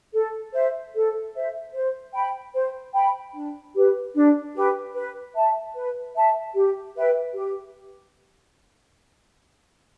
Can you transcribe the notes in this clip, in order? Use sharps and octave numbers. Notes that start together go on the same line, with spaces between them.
A4
C5 E5
A4
C5 E5
C5
G5 B5
C5
G5 B5
D4
G4 B4
D4
G4 B4
B4
E5 A5
B4
E5 A5
G4
B4 E5 G5
G4